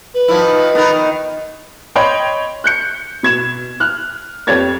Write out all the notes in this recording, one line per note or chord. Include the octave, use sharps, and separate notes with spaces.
B4
D#3 F3 E4
B3 D#4 A#4
D#3
C#5 D#5 G5 B5 C6
F#6 G6 C#7
B2 G#6 E7
F6 F#6
F2 B3 G4 C#5 G#6 A6